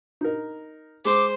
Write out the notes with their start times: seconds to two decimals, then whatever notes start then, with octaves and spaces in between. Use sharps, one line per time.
0.21 D#4 A#4
1.05 G#3 C5 D6